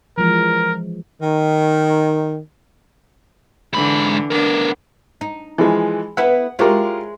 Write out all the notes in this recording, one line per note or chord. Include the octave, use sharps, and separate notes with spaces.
E3 F3 G#3 A#4
D#3
G#2 D3 E3 B5
B3 D4 A#4
D#4
E3 F3 G#3
B3 E4 B4 F#5
G#3 E4 F4 G4 A#4 C#5